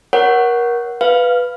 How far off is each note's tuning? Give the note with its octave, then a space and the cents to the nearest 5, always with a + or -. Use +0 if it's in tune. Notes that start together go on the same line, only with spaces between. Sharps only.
A#4 +25 C#5 +0 F#5 +0
B4 +0 F5 +0